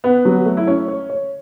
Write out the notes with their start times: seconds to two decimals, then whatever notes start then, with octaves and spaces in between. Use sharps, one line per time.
0.04 B3 B4
0.25 F#3
0.46 A3
0.57 E4
0.67 C#4 C#5
0.88 C#5
1.10 C#5